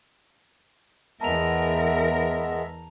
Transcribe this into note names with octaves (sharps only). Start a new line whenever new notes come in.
E2 G#3 B3 A#4 E5 A5 A#5 F7